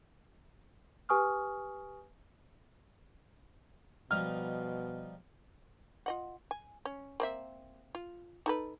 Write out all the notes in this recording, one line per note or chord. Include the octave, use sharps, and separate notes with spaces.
G4 B4 G#5 C#6 D#6 F6
B2 F3 G3 D#4 F6
F4 D#5 F#5
G#5
C#4
A#3 C4 E5
F4
D#4 A4 B4